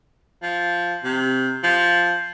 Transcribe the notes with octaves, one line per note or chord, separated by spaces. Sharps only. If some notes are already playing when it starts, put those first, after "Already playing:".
F3
C3
F3